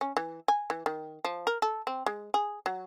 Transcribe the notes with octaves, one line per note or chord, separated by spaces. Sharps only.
C#4
E3
G#5
E3
D#3
F3
A#4
A4
C4
G#3
G#4
F#3